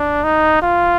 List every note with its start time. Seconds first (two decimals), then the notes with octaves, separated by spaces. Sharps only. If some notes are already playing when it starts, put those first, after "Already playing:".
Already playing: D4
0.24 D#4
0.62 F4